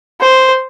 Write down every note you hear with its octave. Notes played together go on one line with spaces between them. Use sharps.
C5